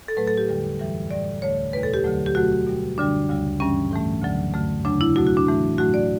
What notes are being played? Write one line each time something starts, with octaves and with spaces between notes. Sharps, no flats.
A4
A2 F#3 A3 B4
A4
G4
E2 D3 G3
F#2 E3 G3
A2 G3 D5
D2 D3 A3 C#5
E2 B2 A3 B4
A4
G4
D2 D3 F#3 A3
G4
B2 F#3 A3 F#4
B2 G3
F#2 D3 G3 D4
D2 C#3 G3
G2 E3 G3 C#4
A2 E3 A3
D2 D3 F#3
F#2 D3 A3
E2 C#3 F#3 A3 D4
E4
B2 F#3 A3 F#4
F#4
D4
A2 E3 A3
A2 F#3 A3 F#4
D5